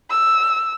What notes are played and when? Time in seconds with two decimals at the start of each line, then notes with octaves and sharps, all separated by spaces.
0.10 E6